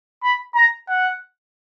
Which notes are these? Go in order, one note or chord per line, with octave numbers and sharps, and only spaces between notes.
B5
A#5
F#5